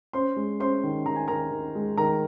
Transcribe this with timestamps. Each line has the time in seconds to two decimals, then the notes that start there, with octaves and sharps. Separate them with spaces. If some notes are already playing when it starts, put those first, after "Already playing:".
0.13 C#4 C5 C6
0.36 G#3
0.60 C#4 C5 C6
0.83 D#3
1.06 D#3 A#5
1.16 G#5
1.27 D#3 A#4 A#5
1.51 D#3
1.75 G#3
1.97 D#3 A#4 A#5